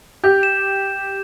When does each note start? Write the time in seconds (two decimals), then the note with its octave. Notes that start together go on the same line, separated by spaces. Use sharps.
0.24 G4 G6
0.43 E7